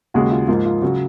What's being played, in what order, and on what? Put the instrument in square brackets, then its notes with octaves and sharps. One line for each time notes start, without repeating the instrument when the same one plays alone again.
[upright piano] D#2 C#3 G#3 F#4
F4
G#2 F3 A#3 F4
F4
C#3 F#3 F#4